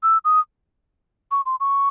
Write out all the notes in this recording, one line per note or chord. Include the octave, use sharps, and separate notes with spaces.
E6
D#6
C#6
C6
C#6